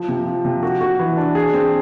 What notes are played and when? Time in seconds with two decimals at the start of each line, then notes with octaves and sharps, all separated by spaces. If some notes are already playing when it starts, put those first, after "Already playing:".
Already playing: F3
0.08 C3
0.26 F3
0.45 C3
0.63 F#4
0.81 F#4
0.99 E3
1.17 D4
1.35 G#4
1.54 C4